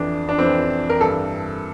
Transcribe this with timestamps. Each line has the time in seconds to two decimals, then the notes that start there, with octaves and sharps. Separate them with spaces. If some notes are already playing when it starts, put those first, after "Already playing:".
Already playing: F2 E3 D4
0.29 D4
0.38 F2 E3 C4
0.90 A#4
1.00 G2 E3 A4